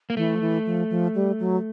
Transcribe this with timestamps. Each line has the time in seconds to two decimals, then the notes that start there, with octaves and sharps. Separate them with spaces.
0.10 A#3
0.17 E3 A3
0.36 F3
0.41 E3
0.66 F3
0.90 F3
1.15 G3
1.40 F#3